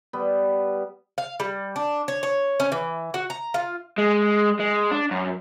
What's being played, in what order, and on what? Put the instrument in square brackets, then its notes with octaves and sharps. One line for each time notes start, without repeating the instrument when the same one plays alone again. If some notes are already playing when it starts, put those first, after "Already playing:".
[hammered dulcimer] G3 B3
[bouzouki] F5
G3
D4
C#5
C#5
C#4
E3
F#4
A#5
F4
[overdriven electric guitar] G#3
G#3
D4
F#2